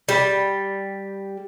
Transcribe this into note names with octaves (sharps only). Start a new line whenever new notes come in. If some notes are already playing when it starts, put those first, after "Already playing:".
G3